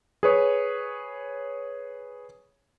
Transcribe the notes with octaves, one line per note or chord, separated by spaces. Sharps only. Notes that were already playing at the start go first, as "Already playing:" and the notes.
G#4 B4 C#5